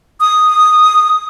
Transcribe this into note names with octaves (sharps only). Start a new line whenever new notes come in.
D#6